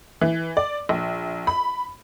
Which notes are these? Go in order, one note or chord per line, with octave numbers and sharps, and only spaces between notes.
E3
D5
A#1
B5